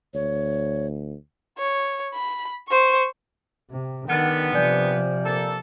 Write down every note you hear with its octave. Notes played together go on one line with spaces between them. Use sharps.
D2 C#5
C#5
B5
C5 C#6
C3
D3 D#3 G3 B3 F#5 F6 A6
C3 F3 D5 G#5 G6
A#3 A4